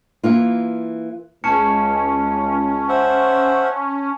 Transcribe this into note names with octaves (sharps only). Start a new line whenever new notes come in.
E3 A#3 F4
C#2 C#4 A5 C#7
C5 E5 F#5